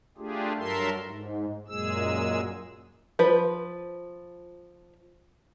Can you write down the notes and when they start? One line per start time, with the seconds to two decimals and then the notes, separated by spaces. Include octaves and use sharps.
0.18 A3 D4 F4 G4 G#4
0.58 G2 F#3 A4 A#4 E5 C6
1.05 G#2
1.68 F#2 A#2 G#3 G#4 E6
3.19 F3 B4